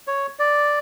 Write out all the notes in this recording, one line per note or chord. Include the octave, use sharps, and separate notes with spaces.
C#5
D5